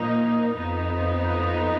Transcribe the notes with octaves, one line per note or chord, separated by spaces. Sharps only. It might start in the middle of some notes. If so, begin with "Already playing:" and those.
Already playing: A#2 F3 A#3 D#4
F2 F3 B3 D#4